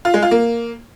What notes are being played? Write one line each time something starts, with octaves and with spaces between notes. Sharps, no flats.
F4
G#3
F4
A#3